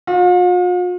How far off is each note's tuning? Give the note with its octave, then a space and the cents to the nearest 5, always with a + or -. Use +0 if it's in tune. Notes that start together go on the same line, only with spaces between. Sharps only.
F4 +45